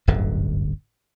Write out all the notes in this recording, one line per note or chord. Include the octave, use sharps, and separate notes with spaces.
D1 G1 F#2 D3